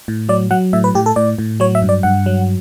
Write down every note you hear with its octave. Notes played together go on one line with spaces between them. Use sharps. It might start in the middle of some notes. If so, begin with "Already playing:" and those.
A2
F#3 D5
F#3 F#5
A2 E5
B4
A2 G4
A4
A2 D5
A2
F#3 C#5
E5
G2
D5
G2 F#5
F#3